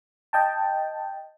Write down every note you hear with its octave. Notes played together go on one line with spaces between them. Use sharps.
D#5 G5 A5